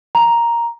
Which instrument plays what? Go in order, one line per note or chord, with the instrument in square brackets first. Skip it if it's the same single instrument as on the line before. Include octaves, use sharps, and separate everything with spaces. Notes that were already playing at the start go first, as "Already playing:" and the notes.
[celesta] A#5